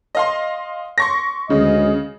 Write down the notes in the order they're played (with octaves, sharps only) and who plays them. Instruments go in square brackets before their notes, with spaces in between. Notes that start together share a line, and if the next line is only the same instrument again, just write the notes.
[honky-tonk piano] D#5 F5 C6
C6 C#6 A#6
[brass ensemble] D2 G#3 D#5 [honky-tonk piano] C#3